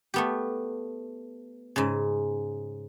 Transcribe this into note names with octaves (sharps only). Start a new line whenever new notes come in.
A3 B3 G4
G#2 C#3